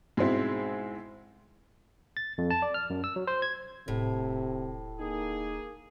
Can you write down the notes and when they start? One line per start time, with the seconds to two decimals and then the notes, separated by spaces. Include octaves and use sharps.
0.17 G#2 B2 G#3 C4 E4
2.17 A6
2.38 F2
2.50 A5
2.62 D5
2.74 F6
2.90 F#2
3.04 E6
3.16 F#3
3.27 C5
3.42 G#6
3.88 D#1 A2 C3
5.00 A#3 D#4 G#4